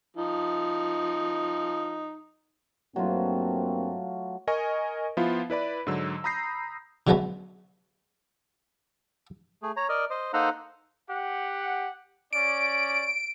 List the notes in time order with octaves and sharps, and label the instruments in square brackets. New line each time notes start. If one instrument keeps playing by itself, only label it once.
[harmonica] F3 D#4
[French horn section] G2 A#3 C4 [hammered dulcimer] F#3 A3 F4
[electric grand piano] A#4 D#5 G#5 C#6
F3 B3 E4 F4
E4 B4 D5 B5
G#2 D3 F#3 E6
A#5 B5 D#6 G6 A#6 C7
[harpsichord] D3 F#3 G#3 A3 B3 C#4
[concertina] A3 G#4
C#5 A#5
A#4 D5 D#5
C5 D#5
A#3 D#4 A4 C5 F#5 A#5
[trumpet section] G4 F#5
[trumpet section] C#4 D5 [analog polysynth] D7